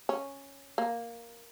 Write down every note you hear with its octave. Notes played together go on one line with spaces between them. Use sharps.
C#4
A#3